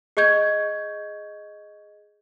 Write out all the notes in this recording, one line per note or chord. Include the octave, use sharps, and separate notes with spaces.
G#4 D#5 C#6 G6 G#6